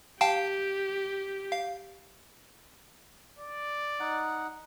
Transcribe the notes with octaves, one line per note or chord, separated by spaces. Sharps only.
G4 F5 G5 A5
F5
D5
D#4 F#5